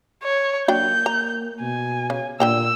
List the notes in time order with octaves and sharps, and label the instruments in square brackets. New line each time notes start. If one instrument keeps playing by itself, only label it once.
[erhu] C#5
[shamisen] F#3 D4 G5 [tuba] A#3 [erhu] G6
[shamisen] A#5
[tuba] B2 [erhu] G#5
[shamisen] C#3
[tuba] A#2 [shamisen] D3 G5 A#5 [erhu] E6